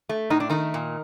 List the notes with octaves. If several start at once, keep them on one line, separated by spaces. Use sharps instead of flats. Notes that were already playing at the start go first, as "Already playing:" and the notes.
A3
A2 D#4
D4
D#3 A3 D#4
A#2